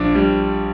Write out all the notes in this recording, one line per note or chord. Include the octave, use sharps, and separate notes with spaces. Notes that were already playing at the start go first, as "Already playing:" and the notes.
Already playing: A#1 D4
G3